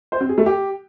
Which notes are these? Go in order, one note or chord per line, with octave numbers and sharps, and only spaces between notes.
C5
C4
G#4
A3
G4